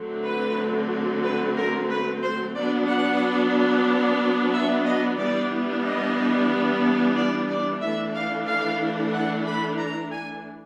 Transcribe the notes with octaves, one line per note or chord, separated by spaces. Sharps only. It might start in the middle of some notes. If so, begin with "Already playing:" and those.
Already playing: D3 F#3 A3 C4
B4
B4
A#4
B4
C5
F#3 B3 D4 D5
F#5
E5
D#5
E3 G3 B3 D4 D5
D#5
D5
D5
E3 A3 D4 E5
F5
F5
F#5
B5
A#5
G#5